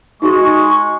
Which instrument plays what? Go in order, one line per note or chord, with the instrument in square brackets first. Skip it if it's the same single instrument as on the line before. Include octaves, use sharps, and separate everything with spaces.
[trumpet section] G#3 C#6 [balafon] D#4 F#4 G#4